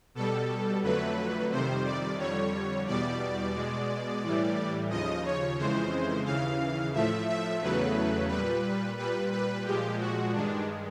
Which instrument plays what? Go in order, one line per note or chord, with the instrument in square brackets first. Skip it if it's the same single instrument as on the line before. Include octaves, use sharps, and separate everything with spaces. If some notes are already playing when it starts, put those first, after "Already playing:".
[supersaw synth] B2 G3 A4
F2 D3 F#3 A3 B4
F2 C3 D#3 G3 C5
D5
F2 D3 G3 C#5
E2 B2 G3 D5
B2 G#3
A2 E3 G3
D#2 C#3 F3 D#5
C#5
F2 C#3 E3 G#3 C5
D#2 C#3 E3 F5
A2 F3 A3 E5
E5
E2 C#3 F#3 A3 B4
A#2 G3 B4
A#2 G3 B4
B4
A#2 F3 G#3 G4
F#4
G2 D#3 G#3 D4